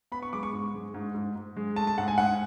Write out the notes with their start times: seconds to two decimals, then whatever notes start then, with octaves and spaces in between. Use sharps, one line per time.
0.12 B3 B5
0.23 C#6
0.33 G#3 D6
0.43 C#6
0.53 G#2
0.74 G#3
0.94 G#2
1.14 G#2
1.35 G#2
1.57 G#3
1.76 A3 A5
1.87 A5
1.98 G#2 F#5
2.08 G#5
2.18 G#2 F#5